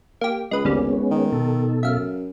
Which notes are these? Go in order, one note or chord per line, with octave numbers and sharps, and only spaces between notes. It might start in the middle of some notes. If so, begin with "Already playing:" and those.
A#3 G4
C#2 G#3 B4
G#1 D2 C#3 G3 G#3 B3 C#4
D#3
B2 A4
F#2 E5 F5